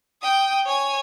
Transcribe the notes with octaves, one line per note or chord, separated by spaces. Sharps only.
G5 D#6
C#5 G#5